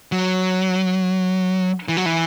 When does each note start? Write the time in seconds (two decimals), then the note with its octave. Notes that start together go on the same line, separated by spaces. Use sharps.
0.12 F#3
1.88 E3
1.97 F#3
2.06 E3